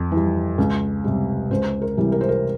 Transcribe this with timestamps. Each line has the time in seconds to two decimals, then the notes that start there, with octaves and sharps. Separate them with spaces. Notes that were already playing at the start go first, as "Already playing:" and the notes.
Already playing: F2
0.12 E3 G3
0.58 C#2
1.04 C3 G3
1.51 C#2 C5
1.82 A#4
1.97 C3 E3 G3
2.12 A#4
2.21 C5
2.29 A#4